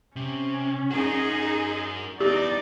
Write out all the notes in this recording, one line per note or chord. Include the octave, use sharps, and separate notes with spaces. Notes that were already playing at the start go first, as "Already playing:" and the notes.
C3 C#4
D#4 F#4 G#4 A#4
B3 D#4 E4 G4 D5